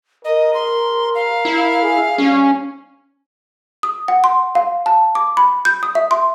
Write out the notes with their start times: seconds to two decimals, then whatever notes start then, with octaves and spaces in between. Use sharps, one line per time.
0.25 A#4 D#5
0.54 C6
1.15 F5
1.45 E4
1.82 G#4
2.18 G3 C#4
3.83 D#6
4.08 F#5
4.24 C6
4.55 F5
4.86 A5
5.15 D6
5.37 B5
5.65 G6
5.83 D#6
5.95 E5
6.11 C6